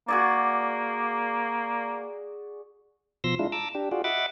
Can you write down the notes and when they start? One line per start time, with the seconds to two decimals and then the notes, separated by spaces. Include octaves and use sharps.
0.08 A#3 F#4 G#4 D5
3.24 B2 F3 C6 E6 A#6
3.39 G#3 D4 E4 F4
3.52 A5 A#5 D6 E6
3.75 D4 G4
3.92 F4 F#4 G#4 D5
4.04 D#5 E5 F#5 B5 D6 A6